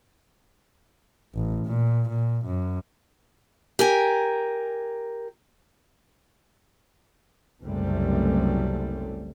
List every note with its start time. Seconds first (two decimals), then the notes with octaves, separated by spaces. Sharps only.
1.34 A1
1.65 A#2
2.09 A#2
2.46 F#2
3.79 G4 A#4 G#5
7.62 F#1 C2 F#2 C3 G3 A3